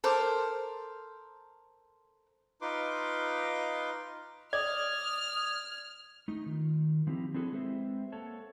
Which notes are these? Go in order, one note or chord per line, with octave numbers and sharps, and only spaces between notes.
A4 A#4 C5 D6
D#4 F4 B4 C6 D6
D5 D#6 F6 G#6
A3 D#4
D#3 F4
F3 C4 D#4 E4 G4
C4 D4 E4 F#4 G#4 A4
G#3 C4 G4 B4 C5 E5
A#3 A4 C#5 F#5 A5